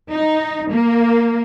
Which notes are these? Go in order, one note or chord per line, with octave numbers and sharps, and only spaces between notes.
D#4
A#3